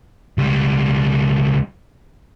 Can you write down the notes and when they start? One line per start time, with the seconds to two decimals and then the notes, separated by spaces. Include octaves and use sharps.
0.38 C#2 G3